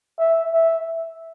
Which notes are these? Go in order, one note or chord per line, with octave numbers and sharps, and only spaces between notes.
E5
E5